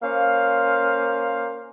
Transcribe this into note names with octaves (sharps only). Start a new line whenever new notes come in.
A#3 C#4 C5 F5